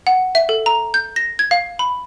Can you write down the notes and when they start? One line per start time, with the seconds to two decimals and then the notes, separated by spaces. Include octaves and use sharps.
0.07 F#5
0.35 E5
0.49 A4
0.66 A#5
0.94 G6
1.16 A#6
1.39 G#6
1.51 F5
1.79 B5